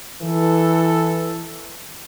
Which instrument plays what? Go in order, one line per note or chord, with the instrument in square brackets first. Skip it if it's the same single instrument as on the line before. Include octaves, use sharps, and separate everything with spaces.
[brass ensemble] E3 A4